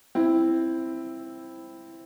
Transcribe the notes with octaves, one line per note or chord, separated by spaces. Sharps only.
C4 E4